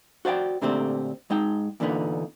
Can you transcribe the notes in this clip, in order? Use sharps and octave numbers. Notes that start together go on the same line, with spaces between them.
F#4 C5 D5 E5 G5
A#2 D3 A3 C4 G4 C5
G#2 G#3 D#4 G5
E2 A#2 D3 B3 D#4